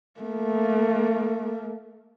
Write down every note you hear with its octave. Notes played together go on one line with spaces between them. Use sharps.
A3 A#3